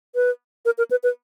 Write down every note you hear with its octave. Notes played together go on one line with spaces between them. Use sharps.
B4
A#4
A#4
B4
B4